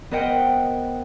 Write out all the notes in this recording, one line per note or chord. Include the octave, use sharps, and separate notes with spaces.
B3 A#4 C5 D#5 F#5 G5